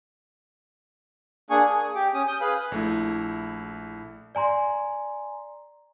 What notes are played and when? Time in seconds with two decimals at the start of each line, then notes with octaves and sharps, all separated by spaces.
1.50 A#3 D4 G#4 G#5 C#6
1.66 G#4
1.95 G4 D6
2.14 C#4 D#6
2.28 D#6 G6
2.41 G#4 B4 F5 B5
2.72 A#1 A3 E4
4.35 D5 G#5 A#5 C6